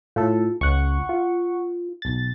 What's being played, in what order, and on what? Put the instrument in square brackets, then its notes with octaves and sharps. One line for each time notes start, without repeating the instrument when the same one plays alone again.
[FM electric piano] A2 A4 [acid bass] F4
[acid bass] C#2 [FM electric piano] F#5 C#6
[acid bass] F4
[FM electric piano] B1 A6